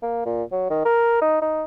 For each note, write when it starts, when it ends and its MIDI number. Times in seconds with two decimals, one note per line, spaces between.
0.03 0.23 58
0.26 0.43 46
0.52 0.69 54
0.70 0.82 51
0.85 1.20 70
1.22 1.38 63
1.42 1.64 63